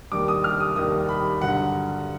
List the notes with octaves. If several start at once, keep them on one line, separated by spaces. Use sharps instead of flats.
D#2 D#3 G3 D6
D#6
F6
D#6
D#2 D#3 G3 D#6
B5
G2 D3 F#3 F#5